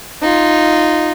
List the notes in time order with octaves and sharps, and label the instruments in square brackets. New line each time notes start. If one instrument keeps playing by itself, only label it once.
[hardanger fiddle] D#4 F4